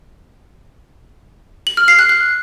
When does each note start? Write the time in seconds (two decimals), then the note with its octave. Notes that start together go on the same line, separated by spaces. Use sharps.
1.67 F#7
1.77 F6
1.88 C7
1.99 F#6
2.09 F#6